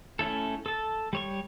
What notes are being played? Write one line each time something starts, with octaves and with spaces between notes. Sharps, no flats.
A3 C#4 E4 A4
A4 A5
G3 C#5 C#6